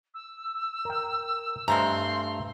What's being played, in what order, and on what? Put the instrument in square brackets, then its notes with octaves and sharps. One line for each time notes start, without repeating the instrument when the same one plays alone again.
[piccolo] E6
[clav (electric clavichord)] A#4 G5
[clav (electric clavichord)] G2 A3 F5 [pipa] G#3 C4 A#5 [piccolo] C6